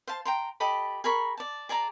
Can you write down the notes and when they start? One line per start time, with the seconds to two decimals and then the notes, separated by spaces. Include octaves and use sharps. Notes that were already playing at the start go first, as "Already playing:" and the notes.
0.07 C5 F5 A5
0.25 G5 A#5 C6
0.60 G4 A4 D#5 B5
1.04 G#4 A#4 B5 C#6
1.37 D5 A5
1.69 G#4 D5 A5 A#5